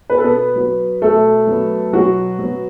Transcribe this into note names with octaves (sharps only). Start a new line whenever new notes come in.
B2 B4
A4
B3 B4
F#3 B3
B2 A3 A4
F#3 B3
B2 F#3 F#4
F#3 B3